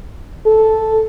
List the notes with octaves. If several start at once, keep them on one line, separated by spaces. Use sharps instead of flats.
A4